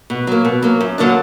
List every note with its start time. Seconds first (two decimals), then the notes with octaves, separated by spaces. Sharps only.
0.10 B2
0.27 F#3 A#3
0.45 B2
0.62 F#3 A#3
0.81 F#2
0.98 D3 F#3 A#3 D4